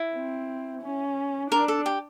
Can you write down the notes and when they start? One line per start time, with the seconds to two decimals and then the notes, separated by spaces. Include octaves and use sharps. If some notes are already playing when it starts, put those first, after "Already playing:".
Already playing: E4
0.13 C4
0.82 C#4
1.51 D4 A#4
1.68 A4
1.86 G4